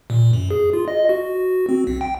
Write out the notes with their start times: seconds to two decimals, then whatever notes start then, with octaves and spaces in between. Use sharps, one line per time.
0.10 A#2
0.33 F#2
0.51 G#4
0.73 F4
0.88 D#5
1.09 F#4
1.69 C4
1.87 B1
2.01 G5